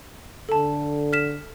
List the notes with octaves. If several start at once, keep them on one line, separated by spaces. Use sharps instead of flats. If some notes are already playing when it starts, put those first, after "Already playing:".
D3 A4 A5
F6 B6 E7